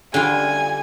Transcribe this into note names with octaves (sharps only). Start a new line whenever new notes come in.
D3 G3 F4 G#5